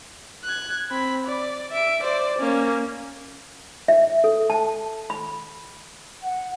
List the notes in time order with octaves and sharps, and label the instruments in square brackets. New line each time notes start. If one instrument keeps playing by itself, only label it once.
[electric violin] F#6 G#6
C4 B5
D5
E5 D7
C5 D5
A#3 C#4
[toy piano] E5
A4
A5
B5
[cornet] F#5